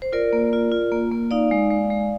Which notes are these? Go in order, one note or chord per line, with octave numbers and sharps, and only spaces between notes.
C5
F4 A#4 D5
A#3
F4
F4
A#3
A#3
D#4 D5 F5
G#3
G#3
G#3